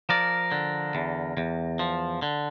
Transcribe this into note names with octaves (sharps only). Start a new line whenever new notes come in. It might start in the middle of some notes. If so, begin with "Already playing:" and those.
F3 A#4 D5
D3
E2
E2
F3
D3